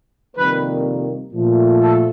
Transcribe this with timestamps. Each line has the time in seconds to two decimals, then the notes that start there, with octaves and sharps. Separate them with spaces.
0.36 F2 C3 D#3 G3 A#3 B4
1.32 A#2 F3 A3
1.80 A4